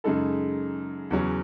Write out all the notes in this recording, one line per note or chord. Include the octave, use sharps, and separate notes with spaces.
F#2 C#3 G#3 D#4 A4
E2 C#3 F#3 C#4